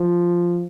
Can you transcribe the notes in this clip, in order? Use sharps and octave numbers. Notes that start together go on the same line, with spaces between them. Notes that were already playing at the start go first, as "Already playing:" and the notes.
Already playing: F3